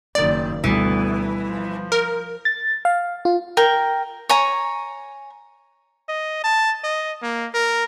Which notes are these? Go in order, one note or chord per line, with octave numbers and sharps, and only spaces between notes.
F#1 D#3 D5
D2 B2 E3 G3 B3
F3
A#4
A6
F5
F4
A#4 G5
C#5 G#5 A#5
D#5
A5
D#5
A#3
A#4